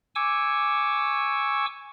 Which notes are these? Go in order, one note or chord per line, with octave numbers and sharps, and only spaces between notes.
G#5 C#6 D6 E6